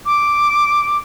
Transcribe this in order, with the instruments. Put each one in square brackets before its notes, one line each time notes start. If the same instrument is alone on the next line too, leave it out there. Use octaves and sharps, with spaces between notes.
[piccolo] D6